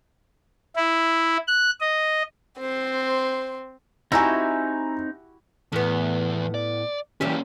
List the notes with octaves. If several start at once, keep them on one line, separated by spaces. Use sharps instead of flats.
E4
F#6
D#5
C4 C5
C4 D#4 E4 F#4 G4 G#5 A#5 E6
E2 A2 B3
D5
E3 G3 A#3 C#4 G4